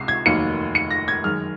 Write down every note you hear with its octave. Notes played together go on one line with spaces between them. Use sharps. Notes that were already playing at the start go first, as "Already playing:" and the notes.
Already playing: C#2 C3 C7
G#6
F1 D#2 D#3 F#3 A#3 C#7
C#7
A#6
G#6
F#2 D#3 G#3 F6